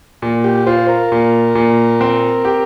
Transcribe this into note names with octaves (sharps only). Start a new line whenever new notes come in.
A#2
G4
F4 C5
A#4
A#2
A#2
C4
G4